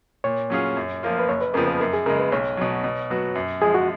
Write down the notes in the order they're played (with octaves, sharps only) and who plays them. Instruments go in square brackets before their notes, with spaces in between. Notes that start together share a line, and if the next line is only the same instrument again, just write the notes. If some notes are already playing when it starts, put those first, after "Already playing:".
[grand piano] A#2 [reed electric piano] C#5
[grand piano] F#3 C#4 F4 G#4
F#2
F3 A#3 F4
[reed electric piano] B4
[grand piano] F#1 [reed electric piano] C#5
[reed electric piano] B4
[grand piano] F2 C#3 F3 B3 [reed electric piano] A#4
[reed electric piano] B4
[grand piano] F#2 [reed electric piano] A#4
[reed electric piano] G#4
[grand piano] C#3 G#3 [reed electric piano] A#4
[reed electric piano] B4
[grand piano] B1 [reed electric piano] C#5
[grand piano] B2 F#3
B2
F#3 B3 F#4
F#2
[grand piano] F3 G#3 [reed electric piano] G#4
[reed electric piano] F#4